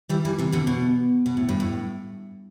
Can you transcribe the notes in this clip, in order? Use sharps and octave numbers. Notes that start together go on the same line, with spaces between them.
E3 G3
E3 G3
C3 E3
B2 D3
B2
B2
A2
G2
A2